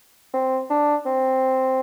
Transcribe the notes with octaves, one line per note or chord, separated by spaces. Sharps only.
C4
D4
C4